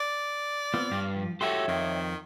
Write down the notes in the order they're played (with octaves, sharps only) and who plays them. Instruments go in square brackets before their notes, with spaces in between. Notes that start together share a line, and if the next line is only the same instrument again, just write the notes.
[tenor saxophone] D5
[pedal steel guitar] B3 C4 F4
[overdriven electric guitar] G2 [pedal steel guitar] F5
[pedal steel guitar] F3
[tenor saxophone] A3 [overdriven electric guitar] F#4 G4 [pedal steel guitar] C#5 E5 C6
[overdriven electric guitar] F2 [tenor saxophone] D#3